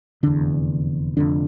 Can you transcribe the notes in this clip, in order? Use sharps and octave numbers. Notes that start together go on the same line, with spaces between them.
F1 E2 D3 D4
F1 F2 D3 D4